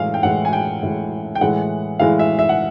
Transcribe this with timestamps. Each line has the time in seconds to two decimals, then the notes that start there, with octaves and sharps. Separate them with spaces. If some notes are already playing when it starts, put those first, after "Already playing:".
Already playing: A2 E3 G#3 F5
0.14 G5
0.23 A2 E3 G#3 F#5
0.45 G#5
0.53 G5
0.83 A2 E3 G#3
1.35 G5
1.41 A2 E3 G#3 F#5
2.00 A2 E3 G#3 F5
2.19 E5
2.39 E5
2.49 F#5